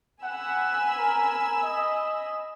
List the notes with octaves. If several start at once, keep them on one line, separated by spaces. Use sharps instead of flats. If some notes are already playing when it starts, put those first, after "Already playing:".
F#5 G#5 B5 E6
A#4
D#5